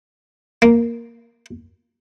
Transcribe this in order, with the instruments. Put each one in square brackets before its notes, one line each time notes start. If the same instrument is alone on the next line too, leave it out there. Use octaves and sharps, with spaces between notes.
[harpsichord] A#3